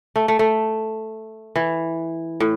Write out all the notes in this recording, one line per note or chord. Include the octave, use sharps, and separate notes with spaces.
A3
A3
A3
E3
A2